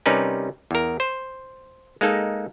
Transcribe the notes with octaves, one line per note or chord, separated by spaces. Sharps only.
C3 G3 C#4 D#4 A#4 B4
E2 A#4
C5
G#3 A#3 D#4 A4